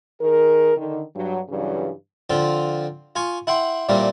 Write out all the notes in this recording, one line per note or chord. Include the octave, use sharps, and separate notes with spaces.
D#3 G#4 A#4
D3 D#3
G2 F#3
G2 C#3 E3 F#3 G3
D3 F3 C4 F4
F4 G#5 C#6
E4 F#5 G5 C6
A#2 E3 G3 A#3 C4